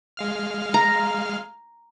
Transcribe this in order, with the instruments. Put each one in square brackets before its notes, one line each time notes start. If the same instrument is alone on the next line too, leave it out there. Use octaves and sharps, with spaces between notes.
[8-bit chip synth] G#3 F5 F6
[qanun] A#5